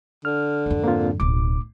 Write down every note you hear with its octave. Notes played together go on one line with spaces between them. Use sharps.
D3 F6
F2 G#2
A#3 C4 F4
D1 B1 D6